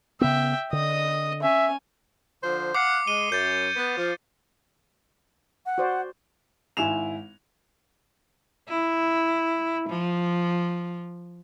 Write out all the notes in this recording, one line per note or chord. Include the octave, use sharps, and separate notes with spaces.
C#3 B3 E5 G5
D3 D#5 D#6
C#4 E5 G#5
D3 F3 C5
F5 F#5 D6 C7 C#7
G#3 D#7 G7
F#2 D6 G6 A6
B3
F3
F#5
F#4 C5 D5
G#1 E4 G#5 E7 F7
E4
F3